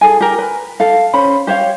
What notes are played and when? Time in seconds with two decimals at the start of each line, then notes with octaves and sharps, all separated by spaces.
0.01 G#4 A4 G#5
0.21 G4 A#4
0.39 B4
0.80 A4 F5
1.14 C#4 C5 B5
1.47 G4 C5 C#5 F5